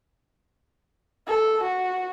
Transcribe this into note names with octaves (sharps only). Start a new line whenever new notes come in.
A4
F#4